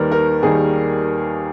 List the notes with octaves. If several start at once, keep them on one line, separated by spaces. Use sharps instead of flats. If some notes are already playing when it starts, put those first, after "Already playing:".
Already playing: D#2 D#3 G3 A#4 B4
A#4
D#2 D#3 G3 G#4